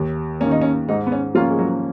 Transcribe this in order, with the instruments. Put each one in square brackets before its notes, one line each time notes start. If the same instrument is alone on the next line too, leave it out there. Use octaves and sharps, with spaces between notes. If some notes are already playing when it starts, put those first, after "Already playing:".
Already playing: [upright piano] D#2
[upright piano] D#3 A#3 [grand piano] C#4
[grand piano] D#4
C#4
[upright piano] G#2 [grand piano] D#4
[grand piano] B3
C#4
[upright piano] F3 A#3 C#4 [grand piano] F4
[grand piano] G#3
F#3